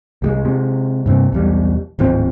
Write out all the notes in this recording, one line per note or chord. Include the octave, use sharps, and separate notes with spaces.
C2 G3 G#3
C3 G#3
G2 C3 C4
B1 E2 G3
D1 G#1 F3 C4